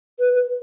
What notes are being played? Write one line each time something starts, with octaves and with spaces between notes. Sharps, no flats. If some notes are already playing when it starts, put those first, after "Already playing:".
B4